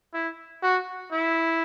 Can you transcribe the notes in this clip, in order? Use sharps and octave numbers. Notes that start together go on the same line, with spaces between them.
E4
F#4
E4